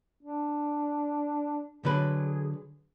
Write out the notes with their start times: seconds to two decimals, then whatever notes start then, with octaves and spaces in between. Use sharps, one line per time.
0.23 D4
1.85 D3 F#3 G#4 B4